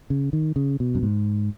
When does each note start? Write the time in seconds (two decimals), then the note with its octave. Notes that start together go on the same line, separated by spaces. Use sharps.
0.10 C#3
0.33 D#3
0.56 C#3
0.80 B2
0.95 F#2
1.03 G#2